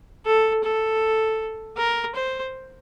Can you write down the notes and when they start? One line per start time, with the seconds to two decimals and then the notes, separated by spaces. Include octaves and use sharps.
0.26 A4
0.64 A4
1.78 A#4
2.15 C5